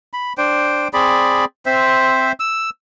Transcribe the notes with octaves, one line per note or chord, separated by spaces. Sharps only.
B5
D4 C5 G5
C4 G#4 D5 B5
C4 C5 E5
E6